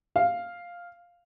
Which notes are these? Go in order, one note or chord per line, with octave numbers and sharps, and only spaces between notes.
F5